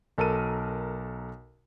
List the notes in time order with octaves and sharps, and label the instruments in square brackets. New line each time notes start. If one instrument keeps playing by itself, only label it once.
[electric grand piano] B1 A4 A#4 D#7